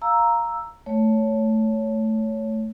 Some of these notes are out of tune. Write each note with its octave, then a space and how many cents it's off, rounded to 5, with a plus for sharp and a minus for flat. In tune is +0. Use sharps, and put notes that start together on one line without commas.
F5 +0 A#5 +0 E6 +0
A3 +0 C#5 +10